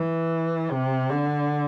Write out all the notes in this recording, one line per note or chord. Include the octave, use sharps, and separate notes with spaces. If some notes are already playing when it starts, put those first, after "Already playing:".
Already playing: E3
C3
D3